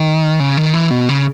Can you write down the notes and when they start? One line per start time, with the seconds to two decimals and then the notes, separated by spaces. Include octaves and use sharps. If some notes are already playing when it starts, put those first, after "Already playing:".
Already playing: D#3
0.40 C#3
0.57 D#3
0.74 E3
0.91 B2
1.09 C#3